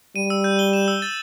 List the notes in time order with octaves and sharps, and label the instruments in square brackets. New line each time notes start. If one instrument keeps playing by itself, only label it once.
[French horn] G3 [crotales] D#7
[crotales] E6
G6
G7
E7
E6
A6